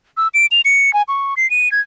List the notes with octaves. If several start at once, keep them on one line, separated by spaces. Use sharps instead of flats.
E6
D7
F7
C#7
G#5
C#6
C7
D#7
G#6